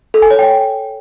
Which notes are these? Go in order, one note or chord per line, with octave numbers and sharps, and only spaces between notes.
A4
G#5
C#5
G5